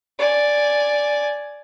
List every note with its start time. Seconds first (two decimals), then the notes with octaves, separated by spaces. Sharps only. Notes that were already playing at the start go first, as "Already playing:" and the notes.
0.19 D5 G#5